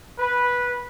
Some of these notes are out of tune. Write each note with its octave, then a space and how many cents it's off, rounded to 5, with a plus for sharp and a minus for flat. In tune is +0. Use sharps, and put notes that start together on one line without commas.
B4 -10